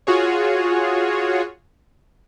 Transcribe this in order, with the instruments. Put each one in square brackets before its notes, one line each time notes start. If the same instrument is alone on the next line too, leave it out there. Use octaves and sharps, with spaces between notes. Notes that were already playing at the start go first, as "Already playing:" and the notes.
[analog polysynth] F4 F#4 G#4 C#5